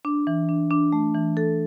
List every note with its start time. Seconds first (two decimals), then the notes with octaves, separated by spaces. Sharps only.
0.05 D4
0.27 E3
0.49 D4
0.71 D4
0.93 A3
1.15 E3
1.37 A4